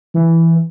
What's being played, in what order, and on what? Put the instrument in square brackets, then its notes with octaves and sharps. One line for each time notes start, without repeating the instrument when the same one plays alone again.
[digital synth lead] E3